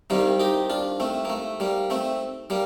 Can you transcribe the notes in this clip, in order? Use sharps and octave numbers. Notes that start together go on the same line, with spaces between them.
C2 C3 D#3 G3 A#3
D#4 G4
D4 F4
A3 C4
A#3
A3
G3 A#3
A3 C4
G3 A#3